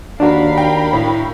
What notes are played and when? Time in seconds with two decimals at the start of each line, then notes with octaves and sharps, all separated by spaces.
0.20 D#2 D4 F#4 A#4 F5 B5
0.58 G5
0.93 A2